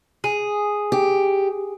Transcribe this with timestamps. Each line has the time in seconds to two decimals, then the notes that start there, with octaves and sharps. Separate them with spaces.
0.24 G#4
0.92 G4